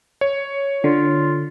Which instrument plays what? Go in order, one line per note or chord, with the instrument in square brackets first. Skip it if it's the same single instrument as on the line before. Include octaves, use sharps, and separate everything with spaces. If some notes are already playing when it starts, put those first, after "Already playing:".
[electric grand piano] C#5
[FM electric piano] D3 [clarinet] F4